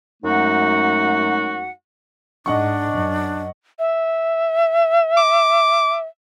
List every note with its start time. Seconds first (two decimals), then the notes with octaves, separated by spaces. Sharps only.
0.23 F#2 G#3 A3 D#4 F#4 F#5
2.46 G#2 D4 D#5 F#5 C#6
2.92 F#2
3.79 E5
5.17 D6